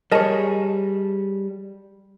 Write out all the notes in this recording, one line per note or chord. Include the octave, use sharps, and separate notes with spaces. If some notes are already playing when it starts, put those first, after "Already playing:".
G3 G#4 A#4 C#5 D#5 A5